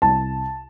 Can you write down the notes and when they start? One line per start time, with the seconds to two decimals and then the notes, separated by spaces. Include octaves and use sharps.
0.02 C2 A5